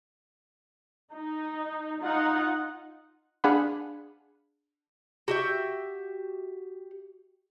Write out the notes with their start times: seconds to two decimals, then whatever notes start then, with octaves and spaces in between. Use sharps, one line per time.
1.14 D#4
2.02 D#4 F4 F#5
3.44 D4 G#4 F5 F#5 B5
5.28 F#4 G4 E5